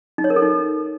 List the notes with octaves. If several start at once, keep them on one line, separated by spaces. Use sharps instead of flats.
D#4
C#5
A#4
A4
D#4